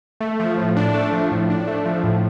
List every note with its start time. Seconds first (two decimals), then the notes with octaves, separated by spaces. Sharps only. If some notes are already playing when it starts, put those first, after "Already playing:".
0.20 A3
0.40 F3
0.58 A2
0.76 D4
0.94 A3
1.13 F3
1.31 A2
1.50 D4
1.68 A3
1.85 F3
2.04 A2